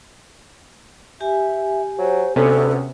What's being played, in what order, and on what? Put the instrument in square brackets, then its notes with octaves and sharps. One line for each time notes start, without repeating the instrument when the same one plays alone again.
[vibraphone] G4 G#5 [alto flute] E5
[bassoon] F#3 [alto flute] C5
[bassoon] D2 [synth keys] C3 B3 C#4 [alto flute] A4